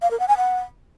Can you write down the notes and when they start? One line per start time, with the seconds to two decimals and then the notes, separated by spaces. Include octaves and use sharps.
0.02 F5
0.11 A#4
0.19 F#5
0.28 G#5
0.37 F#5